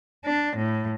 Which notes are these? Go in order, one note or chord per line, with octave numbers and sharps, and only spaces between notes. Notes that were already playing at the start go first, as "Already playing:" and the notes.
D4
A2